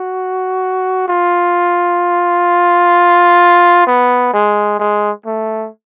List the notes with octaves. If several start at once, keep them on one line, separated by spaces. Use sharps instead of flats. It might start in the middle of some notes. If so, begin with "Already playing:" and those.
Already playing: F#4
F4
B3
G#3
G#3
A3